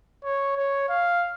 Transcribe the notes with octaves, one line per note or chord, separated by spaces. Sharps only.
C#5
C#5
F5